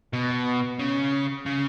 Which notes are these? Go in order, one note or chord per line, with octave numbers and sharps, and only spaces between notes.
B2
C#3
C#3